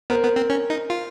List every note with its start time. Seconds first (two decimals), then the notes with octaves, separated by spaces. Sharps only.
0.10 B3 A#4 C5
0.23 B3
0.36 C4
0.50 C#4
0.70 D#4
0.90 F4